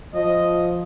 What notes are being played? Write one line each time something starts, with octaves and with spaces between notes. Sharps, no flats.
F3 D#5